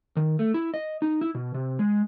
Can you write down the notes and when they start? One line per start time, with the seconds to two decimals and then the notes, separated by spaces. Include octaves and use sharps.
0.16 D#3
0.39 A3
0.54 E4
0.74 D#5
1.02 D#4
1.21 E4
1.35 B2
1.54 C3
1.79 G#3